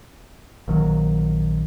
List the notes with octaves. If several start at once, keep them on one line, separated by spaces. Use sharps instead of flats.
A#1 D#3 F#3